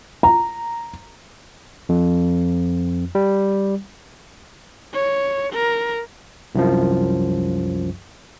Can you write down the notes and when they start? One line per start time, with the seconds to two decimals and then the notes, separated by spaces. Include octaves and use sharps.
0.23 A#5
1.89 F2
3.15 G3
4.93 C#5
5.53 A#4
6.55 C2 F#2 F3